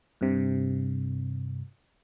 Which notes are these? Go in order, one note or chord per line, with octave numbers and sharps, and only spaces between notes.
G2 C3